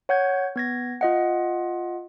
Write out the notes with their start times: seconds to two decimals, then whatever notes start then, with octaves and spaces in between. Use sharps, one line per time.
0.09 C#5 F#5 G6 G#6
0.56 B3 G#6 A#6
1.01 F4 D#5 F#5